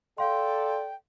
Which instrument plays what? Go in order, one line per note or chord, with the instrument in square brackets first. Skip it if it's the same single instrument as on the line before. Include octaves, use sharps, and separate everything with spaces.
[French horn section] A4 D5 [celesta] F5 C6 [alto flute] G5